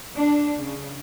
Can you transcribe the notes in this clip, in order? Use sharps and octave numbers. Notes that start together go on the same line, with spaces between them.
D4
C#3